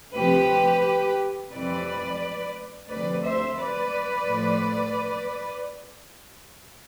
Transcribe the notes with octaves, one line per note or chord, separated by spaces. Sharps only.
D2 C3 F3 G4 B4
F2 C3 E3 B4 D5
D2 C3 F3 B4 D5
C5 E5
B4 D5
A2 F3